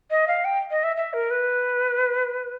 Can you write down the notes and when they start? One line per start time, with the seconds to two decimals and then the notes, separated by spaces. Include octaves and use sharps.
0.11 D#5
0.28 F5
0.45 G5
0.71 D#5
0.84 E5
0.97 E5
1.13 A#4
1.31 B4